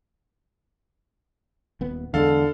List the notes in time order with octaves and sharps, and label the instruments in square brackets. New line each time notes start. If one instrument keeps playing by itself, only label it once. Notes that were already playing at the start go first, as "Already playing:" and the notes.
[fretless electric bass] D#1 B3
[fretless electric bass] E2 G#3 [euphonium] D3 [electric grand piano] A4 F5